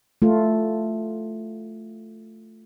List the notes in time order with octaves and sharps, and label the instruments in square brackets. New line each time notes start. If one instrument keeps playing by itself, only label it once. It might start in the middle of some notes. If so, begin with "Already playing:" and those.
[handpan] A3 F4